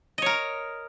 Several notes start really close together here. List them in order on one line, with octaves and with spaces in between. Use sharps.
D#5 C#5 A#4